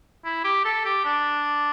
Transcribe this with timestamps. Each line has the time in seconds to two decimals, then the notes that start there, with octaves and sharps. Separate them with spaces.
0.24 E4
0.44 G4
0.65 A4
0.85 G4
1.05 D4